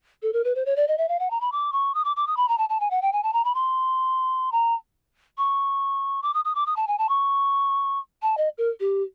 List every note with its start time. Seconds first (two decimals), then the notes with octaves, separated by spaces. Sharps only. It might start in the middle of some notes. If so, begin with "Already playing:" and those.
0.23 A4
0.33 A#4
0.44 B4
0.55 C5
0.66 C#5
0.76 D5
0.88 D#5
0.98 E5
1.08 F5
1.19 F#5
1.31 A#5
1.41 B5
1.52 D6
1.72 C#6
1.94 D#6
2.04 D6
2.16 D6
2.27 D#6
2.37 B5
2.48 A#5
2.58 A5
2.69 A5
2.80 G#5
2.90 F#5
3.02 G5
3.13 G#5
3.23 A5
3.33 A#5
3.44 B5
3.54 C6
4.52 A#5
5.38 C#6
6.22 D6
6.34 D#6
6.45 D#6
6.55 D6
6.66 D#6
6.76 A5
6.88 G#5
6.98 A5
7.09 C#6
8.22 A5
8.37 D#5
8.58 A#4
8.80 G4